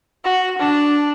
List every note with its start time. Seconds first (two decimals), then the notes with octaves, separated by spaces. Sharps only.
0.24 F#4
0.58 D4